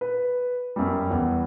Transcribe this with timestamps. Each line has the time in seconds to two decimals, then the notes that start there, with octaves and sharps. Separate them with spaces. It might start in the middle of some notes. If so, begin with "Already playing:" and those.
0.01 B4
0.76 F#2 G3
1.10 E2